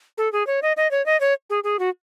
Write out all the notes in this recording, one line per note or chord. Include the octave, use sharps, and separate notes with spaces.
A4
G#4
C#5
D#5
D#5
C#5
D#5
C#5
G#4
G#4
F#4